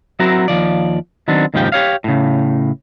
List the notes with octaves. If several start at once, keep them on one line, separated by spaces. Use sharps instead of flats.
F#3 C4 E4 F#4 A#4
D#2 E3 F3 D5
D#3 F#3 B3 C4 D4
D#2 G#2 C#3 F3 G4 G5
G4 C#5 F5
A2 C#3